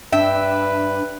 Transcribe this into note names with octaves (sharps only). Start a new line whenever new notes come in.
G2 D4 B4 E5 G5